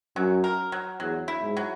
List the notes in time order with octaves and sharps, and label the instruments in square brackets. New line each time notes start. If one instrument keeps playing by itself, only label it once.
[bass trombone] F#2 [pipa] F#3
[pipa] A#4
F#3
[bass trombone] E2 [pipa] F#3
[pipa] E4
[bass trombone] G#2
[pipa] F#3